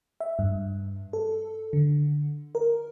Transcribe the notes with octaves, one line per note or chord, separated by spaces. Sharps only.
E5
G2
A4
D3
A#4